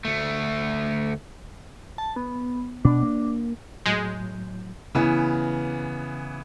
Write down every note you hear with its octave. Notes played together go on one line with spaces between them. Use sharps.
D2 A3
A5
B3
B2 D4
A#3
A2 F#3 G#3 G6
C#3 E3 B3